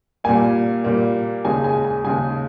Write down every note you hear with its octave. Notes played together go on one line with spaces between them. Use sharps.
A#2 G3 A#3 G#5
A#2 G3 A#3
D#2 C#3 G#3 G#5
G#5
G#5
D#2 C#3 G#3 G#5